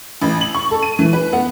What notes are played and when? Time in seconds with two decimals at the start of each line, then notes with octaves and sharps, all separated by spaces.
0.21 A1
0.41 F#7
0.55 C#6
0.71 A4
0.83 D#7
0.99 E3
1.13 B4
1.33 B3